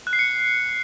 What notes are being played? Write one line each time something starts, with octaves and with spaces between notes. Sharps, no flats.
F#6
C7
C#7